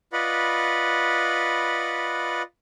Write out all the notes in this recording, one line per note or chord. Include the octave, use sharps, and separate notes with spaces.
F4 B4 D5 D#5 F#5 B5